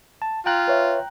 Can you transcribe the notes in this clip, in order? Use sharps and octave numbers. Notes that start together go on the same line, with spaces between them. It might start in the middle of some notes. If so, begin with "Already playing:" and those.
A5
F4 G5 A#5 F#6
B4 C#5 E5